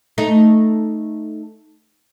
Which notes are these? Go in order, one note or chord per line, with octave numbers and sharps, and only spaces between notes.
A3 D#4